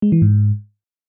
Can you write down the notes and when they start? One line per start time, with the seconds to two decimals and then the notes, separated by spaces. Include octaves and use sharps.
0.02 G#3
0.12 E3
0.22 G#2